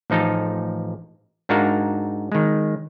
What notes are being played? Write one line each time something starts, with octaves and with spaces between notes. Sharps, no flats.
A1 F3 D#4 A4 F5
G#2 D4 D#4 F#4 A#4 F5
D#3 G#3